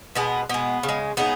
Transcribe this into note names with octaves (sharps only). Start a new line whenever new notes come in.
B2 G#3 B3
B2 G#3 B3
C#3
G#3
C#3 G#3 B3 D#4